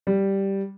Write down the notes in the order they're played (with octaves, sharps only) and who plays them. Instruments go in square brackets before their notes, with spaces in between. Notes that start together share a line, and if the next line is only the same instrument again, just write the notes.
[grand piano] G3